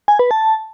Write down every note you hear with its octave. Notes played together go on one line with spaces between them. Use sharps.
G#5
B4
A5